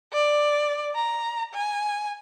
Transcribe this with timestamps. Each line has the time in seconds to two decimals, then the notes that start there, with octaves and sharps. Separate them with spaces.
0.13 D5
0.96 A#5
1.54 G#5